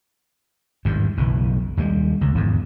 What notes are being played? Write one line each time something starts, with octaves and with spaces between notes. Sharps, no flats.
G#1 E2 G2
F#1 B1 E3
D#2 G3 G#3
C#2
G#1 E2 G#2